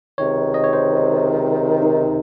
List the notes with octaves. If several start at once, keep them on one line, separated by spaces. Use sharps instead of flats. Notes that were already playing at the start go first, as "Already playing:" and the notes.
C#2 C3 D#3 C#5
D#5
C#5
C5
D#4